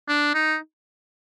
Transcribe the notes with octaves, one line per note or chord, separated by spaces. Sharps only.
D4
D#4